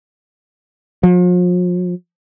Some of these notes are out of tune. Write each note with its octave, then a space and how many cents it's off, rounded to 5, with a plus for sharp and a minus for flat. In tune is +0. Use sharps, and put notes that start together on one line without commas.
F3 +40